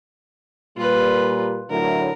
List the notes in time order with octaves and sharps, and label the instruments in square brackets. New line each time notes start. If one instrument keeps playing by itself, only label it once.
[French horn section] A#2 G3 [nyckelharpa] F4 B4
[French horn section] A2 D3 F#3 [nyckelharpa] A#4